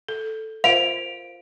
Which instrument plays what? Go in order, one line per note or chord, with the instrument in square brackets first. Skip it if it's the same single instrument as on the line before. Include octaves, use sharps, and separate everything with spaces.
[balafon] A4
[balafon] F4 A#4 C5 [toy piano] F5 [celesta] D7 F7